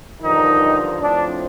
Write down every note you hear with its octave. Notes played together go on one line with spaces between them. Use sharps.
G2 D3 D#3 F3 D#4
A2 F3 C4 D4